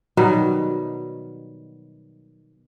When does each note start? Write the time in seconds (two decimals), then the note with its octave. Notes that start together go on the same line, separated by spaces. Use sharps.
0.17 B2 D#3 F#3 G3